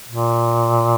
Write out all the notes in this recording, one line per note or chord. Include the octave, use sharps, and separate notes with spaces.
A#2